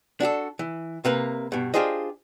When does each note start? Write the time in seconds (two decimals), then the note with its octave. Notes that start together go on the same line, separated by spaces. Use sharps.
0.20 D4 F#4 G4 A4
0.59 E3
1.05 C3 A#3 B4
1.52 G2 B2
1.74 D4 F4 G4 G#4 C5 D#5